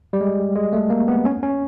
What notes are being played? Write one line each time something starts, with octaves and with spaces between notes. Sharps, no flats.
G3
G#3
G#3
A3
A#3
B3
C#4
C#4